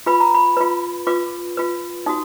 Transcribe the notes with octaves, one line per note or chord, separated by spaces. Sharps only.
F4 B4 B5
A#5
B5
F4 B4
F4 B4 D6
F4 B4
D#4 F#4 D#6